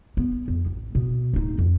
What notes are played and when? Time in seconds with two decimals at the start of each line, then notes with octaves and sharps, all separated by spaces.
0.17 B3
0.48 F2
0.66 A1
0.95 B2
1.33 D1 D#4
1.58 F2